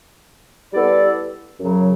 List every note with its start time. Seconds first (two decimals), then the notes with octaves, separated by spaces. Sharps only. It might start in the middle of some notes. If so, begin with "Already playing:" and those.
0.73 G3 B3 E4 A4 D5
1.60 F#2 C#3 F#3